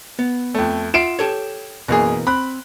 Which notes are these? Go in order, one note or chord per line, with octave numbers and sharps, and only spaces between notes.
B3
F2 A3
F4 E5 F#5 C7 D7 E7
G4 A4 C#5
F#1 B2 E3 A#3 G#4
C4 B5 F#6